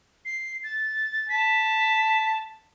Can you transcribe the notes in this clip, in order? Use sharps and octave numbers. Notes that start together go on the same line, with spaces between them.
C7
A6
A5 B6